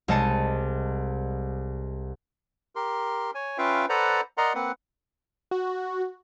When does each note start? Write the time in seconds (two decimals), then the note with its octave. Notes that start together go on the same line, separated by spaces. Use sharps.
0.08 C2 G#3 D#5 A5 C#7 D#7
2.76 G4 A#4 C6
3.35 C#5 G#5
3.58 C#4 F4 B4 E5 F5 G5
3.89 A4 B4 C5 D5 F#5 A#5
4.38 A#4 D5 D#5 F#5 A#5 C6
4.55 A#3 C4 B4 F#5
5.51 F#4